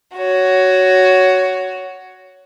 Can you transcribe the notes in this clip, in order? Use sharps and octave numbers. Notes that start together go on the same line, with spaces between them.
F#4 C#5